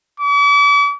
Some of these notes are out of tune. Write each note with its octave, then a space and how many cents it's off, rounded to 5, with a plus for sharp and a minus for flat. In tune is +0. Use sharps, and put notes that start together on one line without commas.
D6 -45